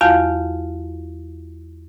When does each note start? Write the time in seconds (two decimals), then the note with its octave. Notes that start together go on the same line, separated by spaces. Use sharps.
0.01 E2 F#3 F4 F#4 F5 A5